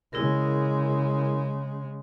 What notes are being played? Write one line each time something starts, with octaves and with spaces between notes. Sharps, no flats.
C#3 G#3 E4 G#4 A#4